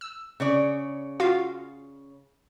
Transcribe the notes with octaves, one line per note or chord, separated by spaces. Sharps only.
E6
C#3 C#5 D5
F4 F#4 F5